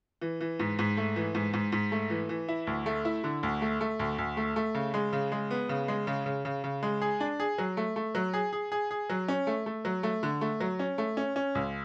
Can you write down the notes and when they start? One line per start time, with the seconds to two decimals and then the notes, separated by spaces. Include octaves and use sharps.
0.22 E3
0.41 E3
0.60 G#2
0.79 G#2
0.97 A3
1.16 E3
1.35 G#2
1.54 G#2
1.72 G#2
1.92 A3
2.10 E3
2.29 E3
2.48 E4
2.67 D2
2.86 A3
3.05 E4
3.24 D3
3.43 D2
3.62 A3
3.81 A3
3.99 D2
4.18 D2
4.37 A3
4.56 A3
4.75 C#3
4.94 G#3
5.13 C#3
5.32 G#3
5.51 B3
5.69 C#3
5.88 G#3
6.07 C#3
6.26 C#3
6.45 C#3
6.64 C#3
6.83 G#3
7.02 G#4
7.20 D4
7.40 G#4
7.58 F#3
7.77 A3
7.96 A3
8.15 F#3
8.34 G#4
8.53 G#4
8.72 G#4
8.91 G#4
9.10 F#3
9.28 C#4
9.47 A3
9.66 A3
9.85 F#3
10.03 A3
10.23 D3
10.41 A3
10.60 F#3
10.79 C#4
10.98 A3
11.17 C#4
11.36 C#4
11.55 C#2